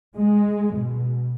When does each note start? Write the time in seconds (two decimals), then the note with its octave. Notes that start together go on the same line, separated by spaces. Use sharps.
0.18 G#3
0.76 B2